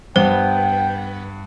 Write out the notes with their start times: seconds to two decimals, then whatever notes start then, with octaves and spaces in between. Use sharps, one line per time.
0.16 G2 B3 C5 G5